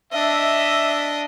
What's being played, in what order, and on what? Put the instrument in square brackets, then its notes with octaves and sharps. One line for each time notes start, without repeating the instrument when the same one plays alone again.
[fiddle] D4 D#5 [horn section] E5